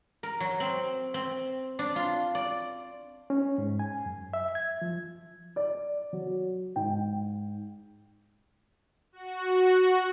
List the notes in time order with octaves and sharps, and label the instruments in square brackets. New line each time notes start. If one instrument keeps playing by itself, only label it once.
[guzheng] A#4
F#3
C4
C4
D4
F4
D5
[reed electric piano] C#4
G#2
G#5
F#2
E5
G#6
F3
[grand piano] D5
F#3
G#2 G5
[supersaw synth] F#4